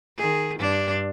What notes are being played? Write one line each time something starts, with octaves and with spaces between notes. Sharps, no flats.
D#3 G#4
G2 D4